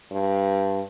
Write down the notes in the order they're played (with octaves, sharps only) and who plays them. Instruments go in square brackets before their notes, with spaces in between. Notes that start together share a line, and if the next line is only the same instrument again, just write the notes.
[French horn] G2